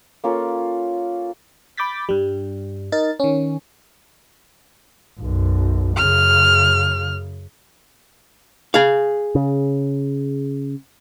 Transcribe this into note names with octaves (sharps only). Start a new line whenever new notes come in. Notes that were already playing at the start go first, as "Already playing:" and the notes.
A#3 C#4 F4 A4
B5 D6 G6 A6 B6
G2 G3
D#4 A#4 A6
D#3 C#4
B1 F#2
F#2 C#3 F6
G#4 F5
C#3